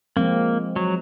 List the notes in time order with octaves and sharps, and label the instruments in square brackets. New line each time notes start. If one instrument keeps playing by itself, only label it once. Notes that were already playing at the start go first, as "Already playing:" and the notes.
[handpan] F3 G#3 C4 [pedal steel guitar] A#3
[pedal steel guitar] F#3